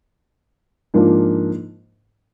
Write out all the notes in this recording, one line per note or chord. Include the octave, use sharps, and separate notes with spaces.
G#2 F3 A#3 D4 F4